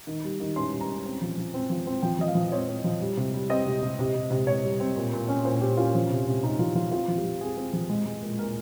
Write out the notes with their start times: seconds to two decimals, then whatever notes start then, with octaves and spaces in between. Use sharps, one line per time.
0.07 D#3
0.24 G3
0.40 D#3
0.56 C#4 C6
0.72 G3
0.81 A#5
0.89 C#4
1.05 C4
1.21 F3
1.38 F3
1.54 C4
1.70 F3
1.87 C4
2.02 F3 G5
2.19 F3 D#5
2.27 F5
2.35 F3
2.52 C4 C#5
2.69 C4
2.84 F3
3.01 G3
3.17 C3
3.34 G3
3.50 C4 D#5
3.66 C3
3.82 C3
3.99 C3
4.15 C3
4.30 C3
4.47 C3 C#5
4.64 G3
4.80 C4
4.96 A#2
5.13 A#2
5.28 C#4
5.45 A#2 C5
5.61 C#4 G4
5.77 C#4 F4
5.95 F3
6.10 C3
6.27 C3
6.43 C3 D#4
6.59 F3 F4
6.75 F3 F4
6.91 C4 F4
7.08 F3
7.16 G4
7.24 F3
7.41 C4 G#4
7.57 C4
7.73 F3
7.90 G#3
8.06 G#3
8.22 A#2
8.39 A#2 A#4